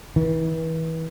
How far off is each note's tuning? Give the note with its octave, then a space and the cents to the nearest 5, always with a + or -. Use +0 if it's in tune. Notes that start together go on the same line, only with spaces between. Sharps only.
E3 -30